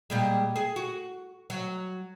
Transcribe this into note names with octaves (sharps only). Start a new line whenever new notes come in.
A#2 G3 G#3
G#4
F#4
F#3